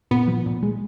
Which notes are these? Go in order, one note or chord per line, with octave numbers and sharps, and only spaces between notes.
A#2 B3
F3
A#2
G#3